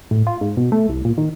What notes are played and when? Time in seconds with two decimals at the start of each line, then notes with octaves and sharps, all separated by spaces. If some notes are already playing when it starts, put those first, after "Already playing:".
0.11 A2
0.27 F4
0.41 G#2
0.57 B2
0.72 A3
0.89 C2
1.05 A#2
1.18 D#3